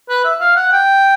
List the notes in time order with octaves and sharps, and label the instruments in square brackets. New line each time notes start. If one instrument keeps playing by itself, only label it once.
[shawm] B4
E5
F5
F#5
G5